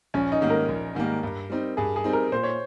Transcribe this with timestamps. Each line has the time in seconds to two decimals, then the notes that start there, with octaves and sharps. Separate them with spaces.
0.14 A#1 C#4
0.32 D#4
0.41 G#2 D#3 G3 A#3
0.50 A#4
0.68 A#1
0.95 G#2 D#3 G3 A#3
1.23 G2
1.50 G3 C4 D#4
1.77 G2 G#4
1.96 G#4
2.04 G3 C4 D#4
2.13 A#4
2.32 A#2 C5
2.43 C#5